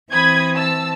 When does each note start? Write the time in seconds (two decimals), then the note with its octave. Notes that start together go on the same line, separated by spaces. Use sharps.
0.11 E3 C4 B5 D#6 G#6
0.55 A5 E6